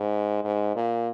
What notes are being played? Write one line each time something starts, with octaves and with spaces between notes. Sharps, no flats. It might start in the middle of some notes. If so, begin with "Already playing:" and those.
Already playing: G#2
G#2
A#2